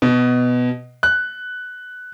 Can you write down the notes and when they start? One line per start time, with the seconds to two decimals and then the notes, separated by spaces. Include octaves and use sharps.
0.02 B2
1.03 F#6